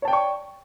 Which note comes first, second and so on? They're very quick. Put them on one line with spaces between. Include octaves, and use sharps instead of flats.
C#5 A5 G5 D5 C#6